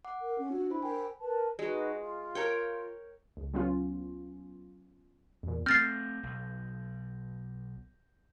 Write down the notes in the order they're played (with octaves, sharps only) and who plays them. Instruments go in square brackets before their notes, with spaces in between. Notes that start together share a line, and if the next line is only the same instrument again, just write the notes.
[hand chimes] F#5 D6
[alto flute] A#4
C#4
[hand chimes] D4 [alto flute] F#4
[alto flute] E4 [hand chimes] C5 B5
[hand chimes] A#4 G#5 [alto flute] G5
[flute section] A#4 B4 A5
[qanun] G#3 [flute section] D#4 F#4 B4
[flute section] F4
[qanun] A#4 C#5 G5
[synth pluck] C#2
F#3 B3 C#4 F4
E2 A#2
[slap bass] A3 C4 [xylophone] F6 A6 C7 [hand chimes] G6 A#6
[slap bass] B1